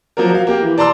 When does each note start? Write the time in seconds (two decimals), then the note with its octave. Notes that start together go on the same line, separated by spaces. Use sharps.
0.17 F3 F#3 A#3 A#4
0.31 F#3 F5
0.47 A#3 G4
0.62 E3
0.78 D5 A5 A#5 C6 E6